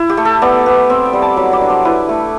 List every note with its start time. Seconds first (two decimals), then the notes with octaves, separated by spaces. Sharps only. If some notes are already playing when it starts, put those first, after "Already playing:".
Already playing: E4
0.10 G4
0.17 A3
0.25 A4
0.42 B3 D5
0.66 B3
0.89 C4 E5
1.06 G5
1.13 G3
1.22 A5
1.37 F#3 B5
1.53 D5
1.61 D4
1.70 C5
1.85 E4 B4
2.09 A3